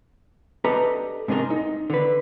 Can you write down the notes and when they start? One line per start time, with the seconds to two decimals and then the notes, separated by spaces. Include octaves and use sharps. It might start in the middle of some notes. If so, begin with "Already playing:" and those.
0.64 D4 G4 A4 B4 D#5 A#5
1.28 G#2 C3 D4 D#4 A#4 C6
1.50 D#4
1.90 D3 B4